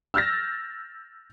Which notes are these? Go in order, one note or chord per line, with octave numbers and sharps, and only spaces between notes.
E6 F6 G6 A6 A#6